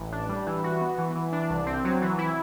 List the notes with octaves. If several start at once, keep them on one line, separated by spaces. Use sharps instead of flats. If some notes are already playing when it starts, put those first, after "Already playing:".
Already playing: A1
D4
G3
E3
F#4
B3
E3
E3
D4
C2
C4
F#3
E3
E4